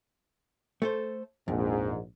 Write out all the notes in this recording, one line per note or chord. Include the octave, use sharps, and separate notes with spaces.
A3 A4 C5
A#1 F2 G#2